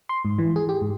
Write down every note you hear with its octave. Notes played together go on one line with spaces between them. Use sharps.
C6
G#2
E3
G#4
G4
G#2